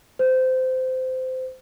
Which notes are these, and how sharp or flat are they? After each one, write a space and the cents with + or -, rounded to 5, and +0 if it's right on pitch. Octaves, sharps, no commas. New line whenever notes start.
C5 -20